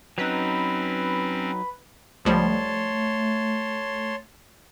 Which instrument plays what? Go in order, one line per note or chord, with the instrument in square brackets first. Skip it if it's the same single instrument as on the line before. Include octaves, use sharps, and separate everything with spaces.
[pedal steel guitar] F#3 D#4 [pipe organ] C4 C#4 [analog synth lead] B4
[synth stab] C#2 F3 G3 [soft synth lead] A3 [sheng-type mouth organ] C#5 A5 C6